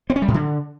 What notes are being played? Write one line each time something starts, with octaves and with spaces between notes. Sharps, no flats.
C4
C#4
G3
A2
D3